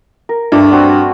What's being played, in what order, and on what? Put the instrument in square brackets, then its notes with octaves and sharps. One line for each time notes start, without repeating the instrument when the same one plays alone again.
[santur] A#4
[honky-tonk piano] G2 [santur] A3 D4 D6
[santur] C4 F#4